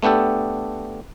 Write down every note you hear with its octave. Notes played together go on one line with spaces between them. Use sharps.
A3 B3 D4 G4 A4